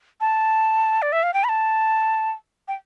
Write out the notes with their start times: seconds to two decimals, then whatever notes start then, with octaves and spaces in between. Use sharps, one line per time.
0.21 A5
1.02 D5
1.12 E5
1.23 F5
1.34 G5
1.44 B5
1.49 A5
2.68 G5